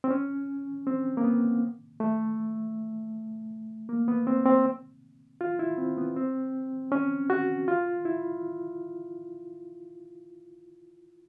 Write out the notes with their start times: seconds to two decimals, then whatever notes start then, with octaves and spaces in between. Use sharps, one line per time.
0.04 C4
0.11 C#4
0.87 C4
1.17 A#3
1.24 B3
2.00 A3
3.89 A#3
4.08 B3
4.27 C4
4.46 C4
5.41 F4
5.59 E4
5.78 C4
5.98 B3
6.16 C4
6.92 C#4
7.30 F#4
7.68 F4
8.05 E4